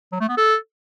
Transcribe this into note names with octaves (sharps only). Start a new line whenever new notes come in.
F#3
A3
B3
A4